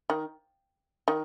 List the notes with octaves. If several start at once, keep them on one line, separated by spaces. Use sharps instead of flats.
D#3
D#3